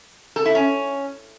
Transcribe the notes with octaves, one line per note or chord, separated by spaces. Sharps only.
A4
E4
C#4